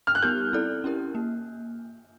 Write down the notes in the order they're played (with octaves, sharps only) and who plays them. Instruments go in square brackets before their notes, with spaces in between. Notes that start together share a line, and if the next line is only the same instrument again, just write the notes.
[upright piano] F6
F#6
[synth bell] G3 B3 D#4 G4 A#4 [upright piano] G6
[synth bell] C4 E4 A4 D5
C#4 E4 G4 A#4
A#3